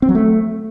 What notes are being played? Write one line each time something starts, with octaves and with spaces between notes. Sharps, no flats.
C4
F#3
A3